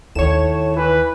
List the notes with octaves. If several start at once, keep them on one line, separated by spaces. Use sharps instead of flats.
D#2 A2 C#5 E7
E3 B4